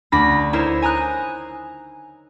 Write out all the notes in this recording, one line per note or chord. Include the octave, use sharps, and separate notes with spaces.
D2 D4 B5 D6 A#6
D#4 E4 A#4 C5 C#5
G#5 A#5 D#6 F#6